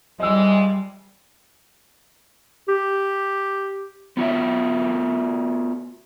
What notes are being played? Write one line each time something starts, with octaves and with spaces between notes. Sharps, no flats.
F2 E3 G3 G#3 D#5 E6
G4
B3 F4 F#4 E5